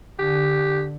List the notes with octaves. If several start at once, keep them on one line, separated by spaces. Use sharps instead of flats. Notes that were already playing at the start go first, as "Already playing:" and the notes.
D3 G4